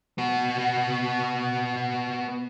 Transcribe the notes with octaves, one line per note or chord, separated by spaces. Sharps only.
B3 F#4